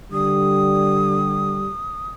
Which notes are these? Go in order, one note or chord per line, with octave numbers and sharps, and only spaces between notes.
D3 G3 D#6